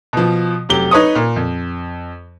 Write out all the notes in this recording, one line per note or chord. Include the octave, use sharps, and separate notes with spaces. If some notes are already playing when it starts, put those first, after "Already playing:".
B2 F3
F1 F#3 G4 G7
D#4 B4 C#5 C#6 D#6
A#2
F2